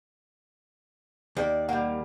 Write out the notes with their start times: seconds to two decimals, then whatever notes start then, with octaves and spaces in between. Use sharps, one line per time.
1.37 D#2 D5
1.69 G3 A#3 F#5